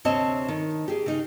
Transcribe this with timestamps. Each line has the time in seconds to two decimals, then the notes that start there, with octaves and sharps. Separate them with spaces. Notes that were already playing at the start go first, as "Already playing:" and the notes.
0.05 D2 C3 C4 C#5 D#5 A5
0.48 D#3
0.88 G4 G#4
1.06 C#3 D#4